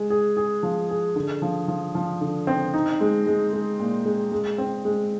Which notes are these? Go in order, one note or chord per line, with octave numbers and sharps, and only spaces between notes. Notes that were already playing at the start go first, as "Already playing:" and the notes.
Already playing: G#3 G#4
G#4
G#4
F3
G#4
D3
F3
F3
F3
D3
C4
D#4
G#3
G#3
G#3
A#2
G#3
G#3
C4
G#3